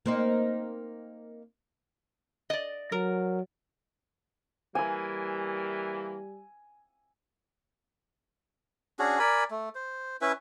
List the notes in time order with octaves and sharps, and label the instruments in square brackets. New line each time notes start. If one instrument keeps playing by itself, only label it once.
[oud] A#3 C4 D#4
[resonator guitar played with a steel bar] D5 D#5
[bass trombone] F#3 [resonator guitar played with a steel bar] A#4
[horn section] E3 A#3 [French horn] G3 [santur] G#5 E6
[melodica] C#4 D4 F#4 G#4
A#4 D5 G#5 B5
A3
C5
C#4 E4 B4 E5